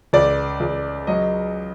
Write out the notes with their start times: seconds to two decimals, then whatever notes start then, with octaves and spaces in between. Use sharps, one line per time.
0.13 C#2 D5
0.60 C#2
1.07 F#3 D#5